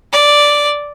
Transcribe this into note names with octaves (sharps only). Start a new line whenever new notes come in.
D5